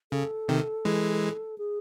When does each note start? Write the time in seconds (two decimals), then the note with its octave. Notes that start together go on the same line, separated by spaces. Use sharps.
0.12 C#3 A4
0.48 C3 D#3
0.85 E3 G#3
1.58 G#4